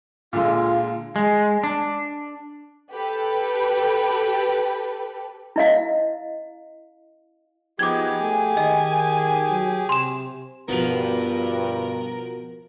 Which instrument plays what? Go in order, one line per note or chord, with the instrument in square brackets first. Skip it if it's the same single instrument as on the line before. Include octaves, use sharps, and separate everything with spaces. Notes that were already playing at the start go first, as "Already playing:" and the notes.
[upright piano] A#2 D3 G#3 [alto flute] F4
[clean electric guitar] G#3
D4
[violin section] G4 A4 B4
[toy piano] E4 D#5 F5
[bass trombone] F3 [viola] B3 D#4 [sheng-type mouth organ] G4 G#4 [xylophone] D6 G#6
[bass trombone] A3 [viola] G#5
[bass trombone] D#3 [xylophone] D#5
[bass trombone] F#3
[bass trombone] C3 [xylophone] C6 E7
[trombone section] G2 [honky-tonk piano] B2 F7 [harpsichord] F3 B3 [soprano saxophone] A#4